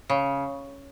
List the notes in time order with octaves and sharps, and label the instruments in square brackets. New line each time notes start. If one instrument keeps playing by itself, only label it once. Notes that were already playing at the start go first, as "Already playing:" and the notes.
[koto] C#3